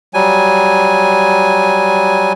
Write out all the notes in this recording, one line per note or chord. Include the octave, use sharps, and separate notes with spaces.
F#3 G3 G#5